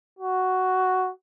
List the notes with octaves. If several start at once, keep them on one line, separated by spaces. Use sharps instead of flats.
F#4